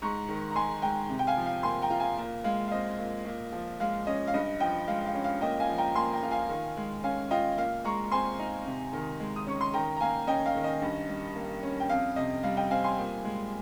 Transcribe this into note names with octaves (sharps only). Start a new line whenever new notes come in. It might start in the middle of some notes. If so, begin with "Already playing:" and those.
G#2 A#5 C#6
D#3
A#5
G#3 G#5 C6
G#2 G5 A#5
C3
G5
F5 G#5
F3
F5
A#3 G#5 C6
G5 A#5
F4
F5 G#5
A#2
G#3 F5
F5
C4 D#5
A#2
A#2
F3
G#3 F5
C#4 D#5
F5
G2 D#5
F3 D#5 G5
G#3 F5
F5
C#4
F5
A#2 D#5 G5
F5 G#5
F3
G5 A#5
A#3 G#5 C6
G5 A#5
F4
F5 G#5
D#3
G#3
C#4 F5 G#5
F4 D#5 G5
A#2 F5
G#3 A#5 C#6
C4 G#5 C6
D#4
C3
D#3
G#3
D#6
C#4 C#6
C6
D#3 G5 A#5
A#5
A#3 F5 G#5
C#4 D#5 G5
F5
D#3
D#5
G2
G3
A#3
C#4
G5
F2 F5
C3 D#5
G3 F5
D#5 G5
C4 F5 G#5
G#5 C6
A#2
G#3